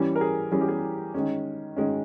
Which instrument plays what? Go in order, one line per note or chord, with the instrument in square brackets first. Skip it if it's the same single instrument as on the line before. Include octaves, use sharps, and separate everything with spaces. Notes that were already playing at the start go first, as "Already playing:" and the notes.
Already playing: [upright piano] E3 G3 C#4
A#4
G#4
E3 G3 C#4 G#4
G4
G#4
D#3 G#3 C#4
D#3 G#3 C#4